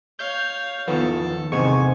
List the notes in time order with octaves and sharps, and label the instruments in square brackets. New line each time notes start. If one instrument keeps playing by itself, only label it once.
[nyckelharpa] C#5 F5 [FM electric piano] G6
[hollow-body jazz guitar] E2 D#3 F3 [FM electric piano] B3 [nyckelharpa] A4
[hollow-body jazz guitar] E2 C3 D#3 [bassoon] G#2 [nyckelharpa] G#5 [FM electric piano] C#6